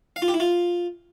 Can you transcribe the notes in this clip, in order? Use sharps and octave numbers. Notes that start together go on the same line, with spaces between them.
F5
F4
G4
E4
F4